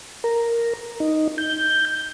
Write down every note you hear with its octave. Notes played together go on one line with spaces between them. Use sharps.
A#4
D#4
G6